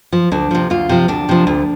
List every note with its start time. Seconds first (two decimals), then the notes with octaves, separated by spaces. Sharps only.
0.13 F3
0.32 D2 D4
0.51 C3 F3
0.70 D2 F4
0.89 C3 F3
1.08 D2 D4
1.29 C3 F3
1.47 D2